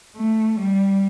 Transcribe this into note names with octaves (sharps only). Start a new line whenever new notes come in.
A3
G3